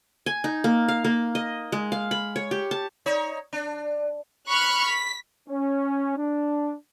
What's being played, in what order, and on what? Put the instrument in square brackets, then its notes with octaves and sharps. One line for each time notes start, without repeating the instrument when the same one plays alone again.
[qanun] G#5
D#4
A#3
F5
A#3
D#5
G#3
F5
B5
C#5
G4
A5
[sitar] D#4 C#5
D4
[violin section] B5 C#6 F6 F#6
B6
[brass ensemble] C#4
D4